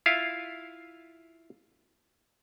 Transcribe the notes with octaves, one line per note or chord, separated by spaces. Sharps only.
E4 F4 E5 F5